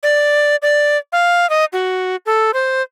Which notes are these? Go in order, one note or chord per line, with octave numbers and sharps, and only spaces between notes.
D5
D5
F5
D#5
F#4
A4
C5